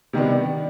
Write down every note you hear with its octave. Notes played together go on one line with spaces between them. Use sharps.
C3 D#3 G3 B3 D4